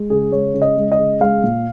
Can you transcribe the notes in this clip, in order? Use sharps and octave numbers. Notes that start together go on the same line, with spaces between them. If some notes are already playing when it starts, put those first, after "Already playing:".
Already playing: G#3
C#3 G#4
G#3 C#5
C#3
D#5
G#3
D#5
C#3
G#3 F5
A#2